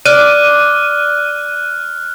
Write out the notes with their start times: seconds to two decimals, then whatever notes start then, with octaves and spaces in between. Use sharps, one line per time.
0.05 D5 F6 F#6 D#7